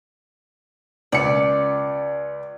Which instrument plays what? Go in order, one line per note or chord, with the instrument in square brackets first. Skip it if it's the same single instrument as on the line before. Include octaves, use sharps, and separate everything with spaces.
[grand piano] C#2 C#7 [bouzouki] D5